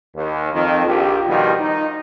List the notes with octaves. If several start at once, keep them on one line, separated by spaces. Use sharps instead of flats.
D#2
F2 D#3
A#1 G4
B2 D#3 F3 G3
D#4